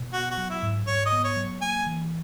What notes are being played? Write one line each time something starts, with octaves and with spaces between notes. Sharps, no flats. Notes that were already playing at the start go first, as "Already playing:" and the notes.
Already playing: B2
B3 F#4
F#4
F#3
E4
G#2
G#2 C#5
D#5
B3
C#5
F#3
A#3 G#5
E3